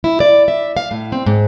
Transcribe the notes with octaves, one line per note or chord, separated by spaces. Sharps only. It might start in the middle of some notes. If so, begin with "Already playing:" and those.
E4
D5
E5
F5
A2
C4
G#2